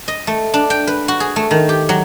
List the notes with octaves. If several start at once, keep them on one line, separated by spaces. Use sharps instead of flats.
D#5
A3
D4
G5
B4
F#4
G#4
A3
D#3
G4
F#3